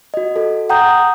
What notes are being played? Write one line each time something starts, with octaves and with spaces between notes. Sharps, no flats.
F#4 D#5
F#4 A4
F#5 G5 A#5 D#6 G6